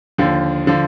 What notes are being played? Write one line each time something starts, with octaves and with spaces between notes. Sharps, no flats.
D#2 D3 F3
D3 F3